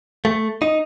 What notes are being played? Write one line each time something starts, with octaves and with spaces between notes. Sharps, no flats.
A3
D#4